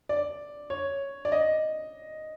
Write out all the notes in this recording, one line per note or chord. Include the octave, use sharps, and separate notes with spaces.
D5
C#5
D5
D#5